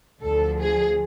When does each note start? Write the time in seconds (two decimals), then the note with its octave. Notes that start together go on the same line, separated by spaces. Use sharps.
0.21 D2 D3 F3 A4
0.58 G#4